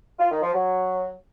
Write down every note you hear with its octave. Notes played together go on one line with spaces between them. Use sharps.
F4
D#3
F3
F#3